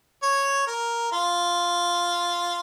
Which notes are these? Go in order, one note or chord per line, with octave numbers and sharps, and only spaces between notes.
C#5
A#4
F4